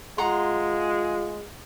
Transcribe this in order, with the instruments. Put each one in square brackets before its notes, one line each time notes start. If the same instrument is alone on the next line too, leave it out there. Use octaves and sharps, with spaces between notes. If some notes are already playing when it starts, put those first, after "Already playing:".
[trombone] G#3 [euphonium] F4 [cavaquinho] F#5 A#5 C6